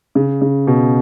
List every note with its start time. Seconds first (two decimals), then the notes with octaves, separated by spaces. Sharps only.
0.15 C#3
0.41 C#3
0.67 B2